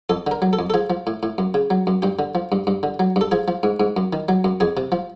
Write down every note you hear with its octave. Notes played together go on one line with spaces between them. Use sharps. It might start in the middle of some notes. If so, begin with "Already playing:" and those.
F2 A4
D3 A#4
F#3
A4
F2
A4
F3 G#4
F3
A2
A2
F#2
C#3
F#3
F#2
G2 G4
D3
F3
G2
G2
D3
F#3
G2 A4
F3 G#4
F3
G#2
G#2
F#2
D#3
F#3
F#2
F2 G#4
C3
F3